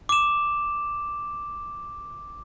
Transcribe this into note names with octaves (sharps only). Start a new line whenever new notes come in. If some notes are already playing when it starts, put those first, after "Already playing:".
D6 E7